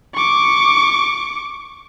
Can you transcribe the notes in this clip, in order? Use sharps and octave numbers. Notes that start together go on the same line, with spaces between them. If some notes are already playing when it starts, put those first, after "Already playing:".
C#6 D6